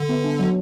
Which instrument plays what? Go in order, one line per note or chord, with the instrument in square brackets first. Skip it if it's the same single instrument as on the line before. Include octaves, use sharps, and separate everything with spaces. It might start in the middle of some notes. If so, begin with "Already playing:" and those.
Already playing: [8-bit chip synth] D3
[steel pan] B3
D4
F#3